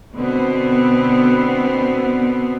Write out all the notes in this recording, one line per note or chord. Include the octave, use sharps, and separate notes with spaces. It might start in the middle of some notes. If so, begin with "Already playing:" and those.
B2 D3 B3 C4